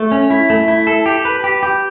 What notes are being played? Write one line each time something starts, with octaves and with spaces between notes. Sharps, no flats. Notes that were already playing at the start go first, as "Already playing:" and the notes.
Already playing: A3
C#4
E4
A3
E4
A4
G4
B4
G4
G4